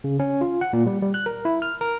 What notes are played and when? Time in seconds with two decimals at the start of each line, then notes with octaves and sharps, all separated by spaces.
0.04 C#3
0.20 C#4
0.41 F4
0.61 F#5
0.73 A#2
0.86 G3
1.02 G3
1.14 F#6
1.26 A#4
1.45 E4
1.62 F6
1.81 A#4